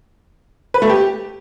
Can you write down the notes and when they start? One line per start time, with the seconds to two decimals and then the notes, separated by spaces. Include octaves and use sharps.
0.74 B4
0.82 A3
0.89 G4